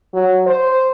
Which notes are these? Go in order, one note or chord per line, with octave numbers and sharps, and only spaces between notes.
F#3
C5